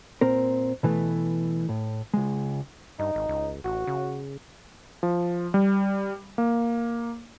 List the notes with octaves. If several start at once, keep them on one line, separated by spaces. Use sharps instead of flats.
A#2 C4 A#4
B2 E3 A3
A2
C#2 G#3
G2 D#4
G#1
C#2
A1 F#4
C#3
F3
G3
A#3